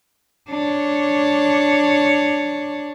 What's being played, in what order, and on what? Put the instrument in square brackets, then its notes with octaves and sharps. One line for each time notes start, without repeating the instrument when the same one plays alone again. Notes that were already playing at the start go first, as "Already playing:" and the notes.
[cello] D4 C#5